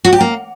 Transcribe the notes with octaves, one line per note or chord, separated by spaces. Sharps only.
F#4
G4
A#3